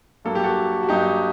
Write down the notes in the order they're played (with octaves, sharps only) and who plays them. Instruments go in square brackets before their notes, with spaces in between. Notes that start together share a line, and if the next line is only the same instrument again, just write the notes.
[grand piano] G2 F#3 A#3 A4
G4
F#4 A4
F#4
G2 F#3 A#3 D#4 G4